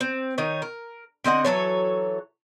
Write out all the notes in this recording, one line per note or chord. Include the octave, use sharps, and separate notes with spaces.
C4
D#3 D#4 C#5
A#4
D3 C4 D#5 F#5
E3 F#3 A4 C#5